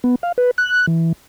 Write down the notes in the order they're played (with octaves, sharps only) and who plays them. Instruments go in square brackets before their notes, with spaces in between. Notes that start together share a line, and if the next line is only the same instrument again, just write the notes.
[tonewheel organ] B3
F5
B4
F#6
E3